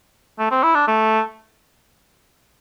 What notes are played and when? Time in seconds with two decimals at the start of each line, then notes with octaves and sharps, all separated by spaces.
0.39 A3
0.51 C4
0.63 E4
0.75 D4
0.87 A3